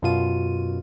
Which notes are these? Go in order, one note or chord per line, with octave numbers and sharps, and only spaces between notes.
F#2 B2 F4 D#7